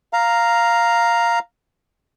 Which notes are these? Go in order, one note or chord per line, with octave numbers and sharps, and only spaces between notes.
F5 A#5